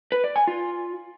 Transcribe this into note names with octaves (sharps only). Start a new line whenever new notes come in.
B4
D5
G#5
F4